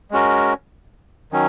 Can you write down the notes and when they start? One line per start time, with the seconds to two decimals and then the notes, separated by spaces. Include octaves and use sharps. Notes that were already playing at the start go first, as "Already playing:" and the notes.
0.11 G#3 C#4 F#4 A#4
1.32 D#3 F#3 C#4